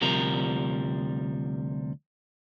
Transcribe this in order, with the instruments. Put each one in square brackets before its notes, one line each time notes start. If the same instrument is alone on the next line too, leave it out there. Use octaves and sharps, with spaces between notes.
[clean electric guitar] D2 C3 F3 G3 A#4